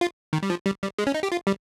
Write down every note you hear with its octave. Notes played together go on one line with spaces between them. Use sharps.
F4
D#3
G3
F3
G3
G3
G#3
C#4
D#4
G4
F4
G3